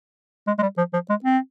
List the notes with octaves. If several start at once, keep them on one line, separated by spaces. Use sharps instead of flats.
G#3
G#3
G3
F3
F3
G#3
C4